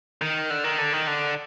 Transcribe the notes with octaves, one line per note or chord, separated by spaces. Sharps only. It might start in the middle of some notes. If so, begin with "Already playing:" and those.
D#3
D3
D#3
D3
D#3
D3